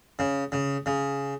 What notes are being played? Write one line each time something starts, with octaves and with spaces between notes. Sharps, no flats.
C#3
C#3
C#3